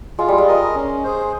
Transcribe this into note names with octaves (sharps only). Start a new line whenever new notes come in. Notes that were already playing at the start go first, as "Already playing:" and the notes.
G#3 F4
G3
G#3
A#4 D#5
C#4
G#4 C5